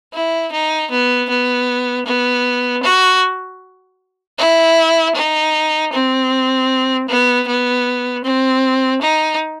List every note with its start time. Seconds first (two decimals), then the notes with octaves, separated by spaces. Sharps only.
0.13 E4
0.52 D#4
0.91 B3
1.29 B3
2.06 B3
2.83 F#4
4.38 E4
5.15 D#4
5.92 C4
7.08 B3
7.47 B3
8.24 C4
9.01 D#4